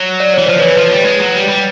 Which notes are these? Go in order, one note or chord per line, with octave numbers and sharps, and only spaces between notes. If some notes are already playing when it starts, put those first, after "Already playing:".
Already playing: F#3
D5
E3 C#5
F3 C5
E3 B4 C#5
F3
G3
G#3
F#3
G3
G3